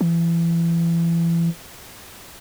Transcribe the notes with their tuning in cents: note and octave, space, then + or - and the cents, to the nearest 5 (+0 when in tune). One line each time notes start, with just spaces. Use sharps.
E3 +30